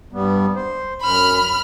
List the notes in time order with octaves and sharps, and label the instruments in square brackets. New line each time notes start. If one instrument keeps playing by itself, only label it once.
[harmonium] G2 G3 B3
C5
[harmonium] F#2 [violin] B5 F6